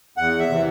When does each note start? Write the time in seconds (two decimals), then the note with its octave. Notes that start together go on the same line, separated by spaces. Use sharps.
0.17 E2 F#5
0.39 E5
0.49 C3 E3